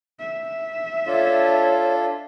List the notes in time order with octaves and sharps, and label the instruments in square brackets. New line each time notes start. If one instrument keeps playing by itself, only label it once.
[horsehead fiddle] E5
[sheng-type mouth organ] D4 F4 A4 [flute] C#5